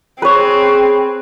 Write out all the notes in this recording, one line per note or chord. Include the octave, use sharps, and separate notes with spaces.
C4 G#4 B4 C#5